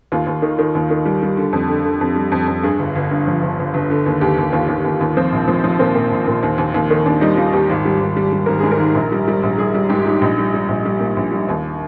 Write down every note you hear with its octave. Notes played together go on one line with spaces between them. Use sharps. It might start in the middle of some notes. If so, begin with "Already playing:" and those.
D#2 F4
D#2
D#3
D#3
D#2
D#3
G3
G3
D3
F2
D3
D3
F2
G3
F2
F2
G2 G#4
G1
G1
G2
F3
G1
G1
G1
D3
D#2
D#2 G4
D#2
D#2 F4
D#2
D#2
D#2
F3 C4
A#1
F3 C4
F3
A#2 C4
A#2
A#1
A#2
D#2
D#2
D#2
D#3
D#2 D4
G3 D#4
G3 F4
D#2 G4
G#1
G3
G#1
G3
G3
G#1 A#4
G#2 G#4
A#4
G#1
A#1
G3
G3
A#1
G3 G#4
G3
G#2 G4
G3
A#1 D#4
G3
G3
A#1
G3
A#2
A#1
G3
D#2